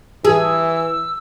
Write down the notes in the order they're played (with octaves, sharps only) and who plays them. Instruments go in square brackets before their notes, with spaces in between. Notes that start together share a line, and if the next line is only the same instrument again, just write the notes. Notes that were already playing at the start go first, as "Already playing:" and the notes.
[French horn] E3 [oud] G#4 [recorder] E6